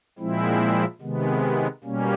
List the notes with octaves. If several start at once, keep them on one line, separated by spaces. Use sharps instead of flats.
A#2 F3 G#3 C4 E4
C3 D#3 G#3 B3
B2 G3 A#3 C#4